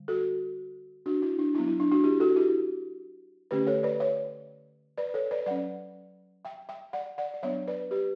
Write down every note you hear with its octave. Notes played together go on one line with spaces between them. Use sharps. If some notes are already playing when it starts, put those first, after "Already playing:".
Already playing: D3 G3
F#4 A4
D4 F#4
E4
D4
F#3 B3 D4 E4
E4
D4
D4 F#4
E4 G4
F#4 A4
E4 G4
D3 A3 C#4 G4 B4
A4 C#5
B4 D5
C#5 E5
B4 D5
A4 C#5
B4 D5
F#3 C#4 D5 F#5
E5 G5
E5 G5
D5 F#5
D5 F#5
D5
F#3 B3 D4 C#5 E5
B4 D5
G4 B4